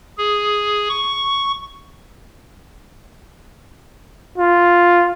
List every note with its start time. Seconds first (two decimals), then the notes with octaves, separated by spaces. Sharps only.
0.18 G#4
0.89 C#6
4.38 F4